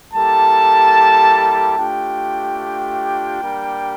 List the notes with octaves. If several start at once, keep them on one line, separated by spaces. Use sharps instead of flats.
G3 A#3 E4 G4 A4 A5
A3 D4 F4 G4 G5
G3 A#3 D4 G4